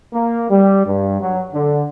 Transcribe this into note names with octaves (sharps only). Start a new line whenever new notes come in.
A#3
G3
G2
F#3
D3